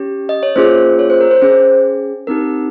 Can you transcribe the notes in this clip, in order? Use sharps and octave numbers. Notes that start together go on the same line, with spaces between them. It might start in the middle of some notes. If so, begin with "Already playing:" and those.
Already playing: C#4 G4
D#5
C#5
A#3 C#4 F4 G#4 C5
C#5
C5
A#4
C5
C#4 G#4 C5
C4 D#4 G4 A#4